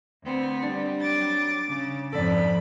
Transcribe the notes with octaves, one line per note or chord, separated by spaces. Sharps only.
D2 B3 C4
G3 D4
F#3 D6 A6
C#3
F2 G#2 A4 D5 B5